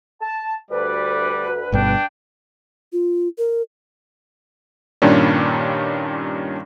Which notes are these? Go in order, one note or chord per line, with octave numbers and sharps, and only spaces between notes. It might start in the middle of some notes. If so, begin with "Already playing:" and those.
A5
D2 G3 B4 D5
G1 G2 B2 D4 G5
F4
A#4
G2 A#2 D#3 G3 C#4 D4